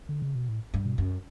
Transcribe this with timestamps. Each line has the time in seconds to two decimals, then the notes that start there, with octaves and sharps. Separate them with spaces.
0.09 D3
0.22 C#3
0.35 B2
0.49 A2
0.74 G2
0.85 B2
0.98 F#2